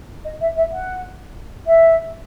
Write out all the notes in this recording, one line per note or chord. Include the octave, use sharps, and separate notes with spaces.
D#5
E5
E5
F#5
E5